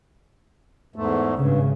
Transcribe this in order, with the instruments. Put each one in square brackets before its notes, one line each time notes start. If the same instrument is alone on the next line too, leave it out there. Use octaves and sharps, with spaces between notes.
[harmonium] E2 G#2 A3
[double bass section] G#1 C#3 [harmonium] G2